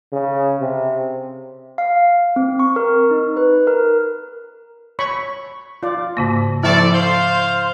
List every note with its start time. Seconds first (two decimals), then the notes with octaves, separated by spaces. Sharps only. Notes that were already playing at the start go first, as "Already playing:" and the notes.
0.13 C#3
0.61 C3
1.78 F5
2.36 C4
2.59 C#6
2.76 A#4
3.11 D#4
3.37 B4
3.67 A#4
4.99 C#5 B5 C#6
5.83 F4 D5
6.17 G#2 C#3 A#3
6.63 F3 A3 C4 E4 D5 A5
6.94 C5 F5